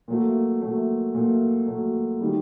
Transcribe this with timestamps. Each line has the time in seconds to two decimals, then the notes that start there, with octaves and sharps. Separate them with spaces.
0.08 A#2 F#3 A3
0.62 A#2 F#3 A3
1.14 A#2 F#3 A3
1.67 A#2 F#3 A3
2.21 D#3 G3